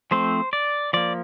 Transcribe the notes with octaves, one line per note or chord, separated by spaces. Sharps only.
F3 A3 C4 C5
D5
F3 A#3 D5